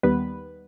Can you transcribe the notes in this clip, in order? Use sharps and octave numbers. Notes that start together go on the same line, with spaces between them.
D#2 D#3 G3 B3 B4